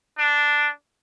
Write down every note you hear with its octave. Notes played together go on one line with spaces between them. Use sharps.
D4